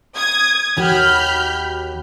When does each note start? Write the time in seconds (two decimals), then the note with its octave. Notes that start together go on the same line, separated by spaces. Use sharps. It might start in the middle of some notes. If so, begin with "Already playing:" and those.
0.16 D#6 G#6
0.77 D#2 F#4 G4 B5 F6 G6